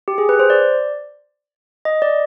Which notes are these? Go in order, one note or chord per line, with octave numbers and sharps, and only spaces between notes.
G4
G#4
B4
C5
D5
D#5
D5